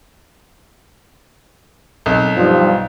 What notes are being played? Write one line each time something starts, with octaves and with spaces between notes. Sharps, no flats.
B1 C4 A5
G2 F3 G3 D#4